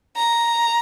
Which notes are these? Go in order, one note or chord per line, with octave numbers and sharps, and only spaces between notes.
A#5